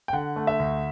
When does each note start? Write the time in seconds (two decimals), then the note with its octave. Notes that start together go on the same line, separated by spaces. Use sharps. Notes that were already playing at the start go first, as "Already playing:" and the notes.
0.08 G5
0.13 D3 F#5
0.36 A3
0.47 E5
0.59 D2